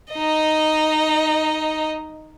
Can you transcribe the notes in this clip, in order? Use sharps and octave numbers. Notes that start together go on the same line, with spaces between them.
D#4 D#5